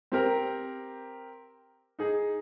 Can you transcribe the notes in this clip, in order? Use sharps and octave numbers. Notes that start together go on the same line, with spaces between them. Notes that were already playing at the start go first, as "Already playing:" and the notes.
C4 G4 A#4
D#4 G#4